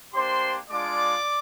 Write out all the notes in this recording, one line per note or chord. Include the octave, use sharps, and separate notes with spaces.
A#3 D4 G4 C5 C6
G#3 D4 F4 D5 D6